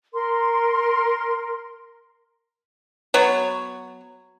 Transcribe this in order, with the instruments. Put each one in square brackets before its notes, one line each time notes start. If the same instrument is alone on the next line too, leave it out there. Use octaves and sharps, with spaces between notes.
[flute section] A#4 C6
[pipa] F#3 B3 C#5